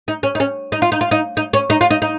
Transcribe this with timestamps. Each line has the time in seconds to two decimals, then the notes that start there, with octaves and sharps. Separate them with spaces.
0.08 D#4
0.23 C#4
0.35 D#4
0.40 C#4
0.72 D#4
0.82 F4
0.92 D#4
1.01 F4
1.11 D#4
1.37 D#4
1.53 C#4
1.70 D#4
1.81 F4
1.91 D#4
2.02 D#4